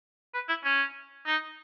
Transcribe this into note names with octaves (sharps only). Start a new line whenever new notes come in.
B4
E4
C#4
D#4